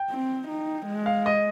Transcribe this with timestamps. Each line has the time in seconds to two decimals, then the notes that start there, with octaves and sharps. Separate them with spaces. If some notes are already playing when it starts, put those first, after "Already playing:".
Already playing: G5
0.10 C4
0.48 D#4
0.87 G#3
1.06 F5
1.26 D#5